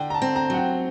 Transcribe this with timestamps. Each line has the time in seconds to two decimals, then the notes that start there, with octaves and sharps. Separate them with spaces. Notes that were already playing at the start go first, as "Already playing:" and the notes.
Already playing: D3 G5
0.10 A#5
0.14 A5
0.22 C4
0.36 A#5
0.50 F#3 F#5
0.57 G5